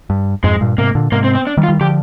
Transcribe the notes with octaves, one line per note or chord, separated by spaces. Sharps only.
G2
F2 G#2 G#3
G2 A#2
G#2 C3 A#3
A#2 D3
G#2 C3 A#3
C4
C4
D4
D#3 G3
F4
D#3 G3
D3 F3 G4